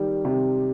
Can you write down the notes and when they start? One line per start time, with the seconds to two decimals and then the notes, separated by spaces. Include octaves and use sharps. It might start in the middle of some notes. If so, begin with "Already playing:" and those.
Already playing: D#3 G3
0.25 C3